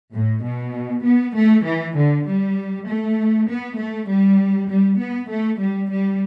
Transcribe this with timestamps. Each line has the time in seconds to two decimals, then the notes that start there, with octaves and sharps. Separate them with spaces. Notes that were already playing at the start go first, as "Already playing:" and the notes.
0.13 A2
0.43 B2
1.04 B3
1.34 A3
1.65 E3
1.95 D3
2.25 G3
2.86 A3
3.47 B3
3.78 A3
4.08 G3
4.69 G3
4.98 B3
5.29 A3
5.59 G3
5.90 G3